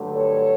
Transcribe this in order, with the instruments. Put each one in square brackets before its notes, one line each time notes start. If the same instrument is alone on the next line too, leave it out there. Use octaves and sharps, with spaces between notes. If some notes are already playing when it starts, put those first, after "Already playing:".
Already playing: [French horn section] G2 D3 F#3 A3
A4 C#5